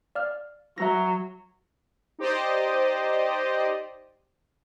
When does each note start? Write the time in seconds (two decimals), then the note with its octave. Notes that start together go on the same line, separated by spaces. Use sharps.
0.15 D5 F5 F6
0.78 F#3 E5 A#5 A#6
2.19 D#4 G4 C5 D5 D#5